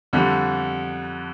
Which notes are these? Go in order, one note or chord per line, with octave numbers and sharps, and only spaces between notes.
F2 D3 G3